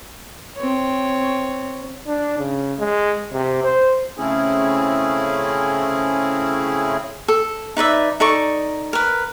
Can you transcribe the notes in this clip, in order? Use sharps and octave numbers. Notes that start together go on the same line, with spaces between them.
C4 C#5
D4
C#3
G#3
C3
C5
C#3 A3 C4 C#4 E4 G#4
A4
D#4 B4 D5 E5
D#4 A4 D5 C#6
A#4 B4